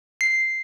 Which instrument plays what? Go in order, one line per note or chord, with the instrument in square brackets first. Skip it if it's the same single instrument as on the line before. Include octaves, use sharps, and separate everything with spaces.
[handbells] C7